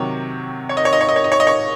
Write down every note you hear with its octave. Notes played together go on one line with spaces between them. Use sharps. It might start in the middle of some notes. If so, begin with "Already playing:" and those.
Already playing: C3 D#3 F#3 C#5
C#5
D#5
C#5
D#5
C#5
D#5
C#5
D#5
C#5
D#5
C#5